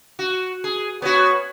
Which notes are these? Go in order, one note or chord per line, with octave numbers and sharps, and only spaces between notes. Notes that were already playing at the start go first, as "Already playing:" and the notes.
F#4
G#4
B3 C#4 F#4 C#5